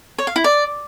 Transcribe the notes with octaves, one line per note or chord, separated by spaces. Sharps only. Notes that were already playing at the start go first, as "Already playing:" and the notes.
C#5
F5
E4
D5